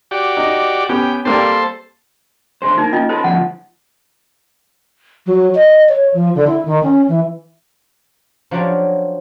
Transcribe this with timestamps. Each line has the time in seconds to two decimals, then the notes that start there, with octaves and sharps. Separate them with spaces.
0.11 F#4 G4 D5
0.37 D#4
0.89 B3 C#4 G4 G5
1.25 G3 A#3 C4 A4 C5
2.62 D3 G#4 C5
2.78 A#3 D#4
2.93 C#4 F4 D#5
3.09 A4 B4 C5
3.24 D2 F3 F#5
5.26 F#3
5.55 D#5
5.89 C#5
6.14 F3
6.35 D3
6.47 E4
6.65 D#3
6.83 C#4
7.08 E3
8.51 F3 F#3 D4 G4 C#5 D5